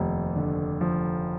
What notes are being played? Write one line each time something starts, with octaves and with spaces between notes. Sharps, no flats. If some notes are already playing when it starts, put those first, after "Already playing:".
Already playing: F1 D#2 F3
D3
F3